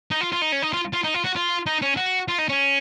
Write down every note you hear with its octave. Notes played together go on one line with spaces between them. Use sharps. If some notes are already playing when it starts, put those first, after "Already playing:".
D#4
F4
F4
D#4
C#4
D#4
F4
F4
D#4
F4
F#4
F4
D#4
C#4
F#4
F4
D#4
C#4